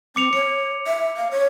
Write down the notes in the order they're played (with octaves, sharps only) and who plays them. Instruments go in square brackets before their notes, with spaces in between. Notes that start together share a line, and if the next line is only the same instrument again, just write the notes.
[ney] C4 [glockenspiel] D6 C#7 F7
[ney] C#5 [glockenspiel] C#7
[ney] E5
F5
C#5